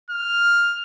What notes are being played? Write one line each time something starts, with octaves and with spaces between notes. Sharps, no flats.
F6